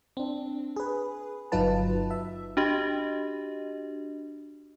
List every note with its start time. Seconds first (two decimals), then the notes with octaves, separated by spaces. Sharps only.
0.17 C4 D4
0.76 G#4 B4
1.52 G1 F#3 D#4 F4 B4 A5
2.11 E5
2.57 D4 F#4 G4 D#5